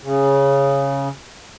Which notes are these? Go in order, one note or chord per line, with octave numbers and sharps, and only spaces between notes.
C#3